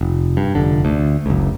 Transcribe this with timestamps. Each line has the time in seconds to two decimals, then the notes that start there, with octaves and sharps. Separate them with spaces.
0.01 F1
0.37 G2
0.55 F1 D3
0.85 D2
1.26 F#1 C#2